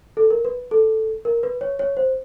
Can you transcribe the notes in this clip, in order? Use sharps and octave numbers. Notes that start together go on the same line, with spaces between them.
A4
A#4
B4
A4
A#4
B4
C#5
C#5
C5